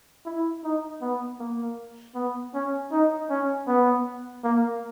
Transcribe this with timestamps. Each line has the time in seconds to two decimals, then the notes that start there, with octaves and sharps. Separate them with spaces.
0.26 E4
0.64 D#4
1.01 B3
1.39 A#3
2.15 B3
2.54 C#4
2.92 D#4
3.30 C#4
3.67 B3
4.44 A#3